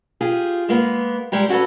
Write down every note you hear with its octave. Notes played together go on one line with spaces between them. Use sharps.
F4 G4 G#4
G#3 A#3 B3
G3 G#3 G4 A#4
C#4 F#4 G4 A4 B4